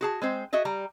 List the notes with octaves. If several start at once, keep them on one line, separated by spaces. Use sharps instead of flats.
F#4 G#4 A5
G#3 C4 C5
F#4 G#4 D#5 E5
G3 A#5